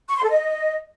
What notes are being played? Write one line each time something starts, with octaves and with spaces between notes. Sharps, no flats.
C#6
C6
A4
D#5